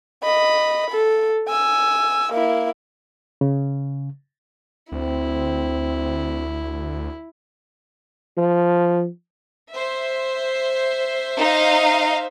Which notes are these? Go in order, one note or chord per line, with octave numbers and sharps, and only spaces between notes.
D#5 B5
A4
G#5 E6
A#3 E4
C#3
D2 C4 E4
F3
C5 E5
D#4 F5